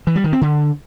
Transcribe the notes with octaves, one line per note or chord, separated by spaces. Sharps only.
E3
G3
D#3
C4
D3